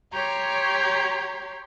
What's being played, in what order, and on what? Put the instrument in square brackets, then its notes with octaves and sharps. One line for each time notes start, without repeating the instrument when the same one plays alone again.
[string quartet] G4 C#5 A#5 C6